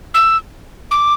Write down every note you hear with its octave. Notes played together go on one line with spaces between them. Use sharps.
E6
D6